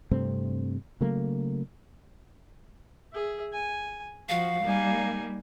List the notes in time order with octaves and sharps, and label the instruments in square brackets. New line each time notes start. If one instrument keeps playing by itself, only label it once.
[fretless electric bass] G2 C3 A3 C4
C#3 F#3 A3 A#3
[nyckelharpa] G#4 E5
G#5
[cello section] F3 [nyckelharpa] F#4 [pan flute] F5
[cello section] G3 A#3 [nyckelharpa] D#4 G#5